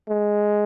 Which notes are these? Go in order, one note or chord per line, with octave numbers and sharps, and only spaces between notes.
G#3